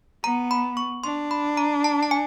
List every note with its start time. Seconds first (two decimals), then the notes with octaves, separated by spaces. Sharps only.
0.24 B3 A#5
0.51 B5
0.77 C#6
1.04 D4 C6
1.31 B5
1.57 A#5
1.84 A5
2.03 A5
2.11 G#5